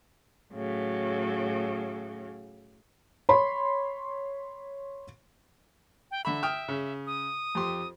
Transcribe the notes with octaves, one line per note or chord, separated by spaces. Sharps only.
A2 C#3 F#3
C#5 B5 C6
G5
D3 E5 B5
G5 D#6 F6
C#3
D#6
F2 G4 C6